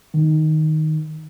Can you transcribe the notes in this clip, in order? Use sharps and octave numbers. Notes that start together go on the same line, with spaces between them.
D#3